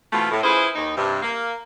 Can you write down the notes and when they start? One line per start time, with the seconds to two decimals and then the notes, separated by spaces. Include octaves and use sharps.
0.13 B2 E3 A3 C4 F4
0.31 A2
0.43 C#4 E4 F4 G#4 B4 C5
0.75 D#2 D#4
0.96 G2 C3
1.22 A#3